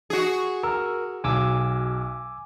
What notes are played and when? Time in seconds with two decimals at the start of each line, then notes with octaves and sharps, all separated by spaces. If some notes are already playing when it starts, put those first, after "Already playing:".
0.10 F#4 G#4
0.63 A#4 E6
1.24 B1 G#5 D6 E6